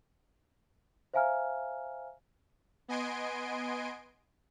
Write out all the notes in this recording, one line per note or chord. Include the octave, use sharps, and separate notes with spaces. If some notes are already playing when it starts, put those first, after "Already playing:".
C5 E5 F5 G#5 A#5 F6
B3 D#5 G#5 C6 D7